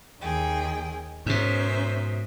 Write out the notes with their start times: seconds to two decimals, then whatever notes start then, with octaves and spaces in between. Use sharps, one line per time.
0.21 D#2 G#4 G5
1.26 G#2 B2 C#4 A#4 C5 E5